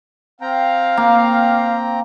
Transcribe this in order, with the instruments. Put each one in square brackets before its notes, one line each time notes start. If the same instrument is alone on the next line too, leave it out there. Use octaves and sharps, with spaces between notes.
[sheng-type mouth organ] C4 G5 A#5 [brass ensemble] F5
[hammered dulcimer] A#3